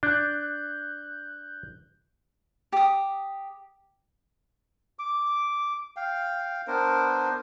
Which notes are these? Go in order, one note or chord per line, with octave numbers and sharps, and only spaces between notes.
D4 F#6 G6
G4 D#6
D6
F5 G5
B3 D4 A#4 C5